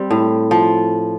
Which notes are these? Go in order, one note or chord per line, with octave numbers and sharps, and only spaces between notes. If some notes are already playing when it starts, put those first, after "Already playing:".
Already playing: G3 C4
A2
F3